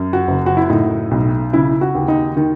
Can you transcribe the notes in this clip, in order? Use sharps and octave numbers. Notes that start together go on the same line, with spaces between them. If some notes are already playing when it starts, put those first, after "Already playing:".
Already playing: F#2
F#4
F#1
F#4
E4
A2 D#4
B1
C#3 E4
F#4
D#2
D#4
D#3